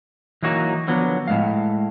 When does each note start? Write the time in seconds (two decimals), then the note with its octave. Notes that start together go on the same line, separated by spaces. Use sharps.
0.42 E3 F#3 A#3 D#4 F#4
0.88 D3 F3 F#3 B3
1.28 A2 G#3 F5